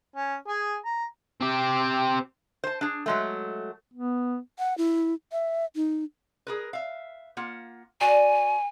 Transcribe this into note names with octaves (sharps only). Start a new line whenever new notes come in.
C#4
G#4 G#5
A#5
C4 G4
C5 A5
D4 G#4
F#3 G#3 A3
B3
F#5
E4
E5
D#4
G#4 A#4 B4
E5 F5
A#3 F4 F#5
F#4 D5 G#5